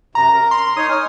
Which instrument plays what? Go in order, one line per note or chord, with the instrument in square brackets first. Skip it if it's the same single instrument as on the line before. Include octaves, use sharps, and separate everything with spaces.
[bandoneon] F#2 C3 [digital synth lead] A#5
[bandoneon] A#4
[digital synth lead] C6
[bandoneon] D#4 C#5 [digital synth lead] D#6
[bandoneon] G#5 F6